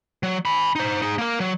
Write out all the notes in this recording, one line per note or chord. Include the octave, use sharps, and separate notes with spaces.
F#3
G#5 B5
D#4 C5
D#4 G#4
A#3 A#4
F#3